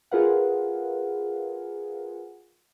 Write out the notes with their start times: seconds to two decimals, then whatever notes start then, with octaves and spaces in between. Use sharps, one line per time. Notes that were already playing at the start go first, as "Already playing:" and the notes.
0.11 F4 G#4 A#4 B4 F5 F#5